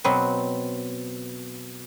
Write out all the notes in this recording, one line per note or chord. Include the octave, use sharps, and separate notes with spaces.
B2 F#3 C4 B4